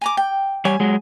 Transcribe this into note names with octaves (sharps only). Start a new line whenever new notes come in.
G#5 A#5 D6
G5
G3 C#5 G#5
F#3 G#3